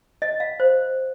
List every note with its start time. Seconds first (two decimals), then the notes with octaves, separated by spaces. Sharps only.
0.22 D#5
0.40 F5
0.60 C5